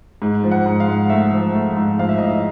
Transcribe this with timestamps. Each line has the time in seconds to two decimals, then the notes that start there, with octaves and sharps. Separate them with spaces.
0.22 G#2
0.43 F3
0.51 F#5
0.66 G#2
0.80 F5
0.88 G#2
1.10 A3 E5
1.33 F3
1.55 A3
1.77 G#2
1.99 F3 F5
2.09 E5
2.18 A2 D#5
2.28 E5